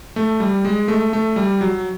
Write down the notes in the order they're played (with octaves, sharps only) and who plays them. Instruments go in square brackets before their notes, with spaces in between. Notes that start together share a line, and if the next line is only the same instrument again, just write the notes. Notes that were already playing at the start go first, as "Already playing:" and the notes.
[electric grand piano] A3
G3
G#3
A3
A3
G3
F#3